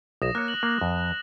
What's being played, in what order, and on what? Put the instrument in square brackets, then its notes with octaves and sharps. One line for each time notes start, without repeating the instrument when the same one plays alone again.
[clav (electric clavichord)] B1 [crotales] D#6 A#6 E7
[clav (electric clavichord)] A#3 C#5 [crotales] F#6
[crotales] F#7
[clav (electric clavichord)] A#3
F2